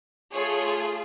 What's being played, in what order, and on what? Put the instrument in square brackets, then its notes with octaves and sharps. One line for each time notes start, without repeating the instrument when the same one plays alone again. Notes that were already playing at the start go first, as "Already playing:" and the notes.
[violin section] A3 F4 G#4 C#5